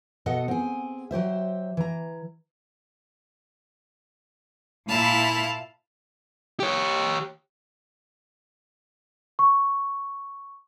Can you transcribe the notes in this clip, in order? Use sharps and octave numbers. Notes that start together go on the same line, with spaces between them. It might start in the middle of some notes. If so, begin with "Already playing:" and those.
B2 A4 D#5 F#5
C4 G#4
F#3 G4 C5 E5
E3 A#5
A#2 E4 F5 A5
G4 C#5
C#6